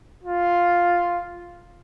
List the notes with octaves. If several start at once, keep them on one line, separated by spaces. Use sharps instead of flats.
F4